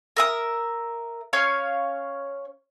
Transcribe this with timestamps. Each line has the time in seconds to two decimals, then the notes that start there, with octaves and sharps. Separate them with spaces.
0.16 A#4 E5 D#6
1.33 C#4 C#5 F5